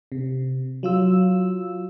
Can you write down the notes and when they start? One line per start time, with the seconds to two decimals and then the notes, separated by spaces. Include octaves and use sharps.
0.12 C3
0.83 F#3 F4 E6